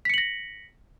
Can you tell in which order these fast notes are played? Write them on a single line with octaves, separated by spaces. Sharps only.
B6 C#7 F#7 A#6